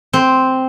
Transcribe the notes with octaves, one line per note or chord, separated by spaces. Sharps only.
C4